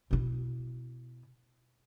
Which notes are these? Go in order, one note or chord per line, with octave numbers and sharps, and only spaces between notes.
B2 E4